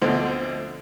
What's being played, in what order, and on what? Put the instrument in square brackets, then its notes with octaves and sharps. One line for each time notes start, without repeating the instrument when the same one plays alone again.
[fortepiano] D2 B2 D3 F3 C4